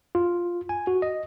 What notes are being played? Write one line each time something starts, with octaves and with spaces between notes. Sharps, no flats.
F4
G#5
F#4
D#5